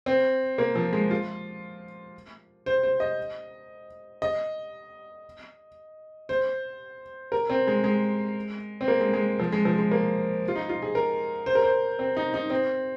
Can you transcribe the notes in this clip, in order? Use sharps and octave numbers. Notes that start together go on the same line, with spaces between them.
C4
A#3
F3
G#3
F4
C5
C5
D#5
D#5
C5
A#4
C4
G#3
G#3
C4
A#3
G#3
G#3
F3
G#3
F3
G#3
A#3
F4
D#4
F4
G#4
A#4
C5
A#4
C5
C4
D#4
D#4
C4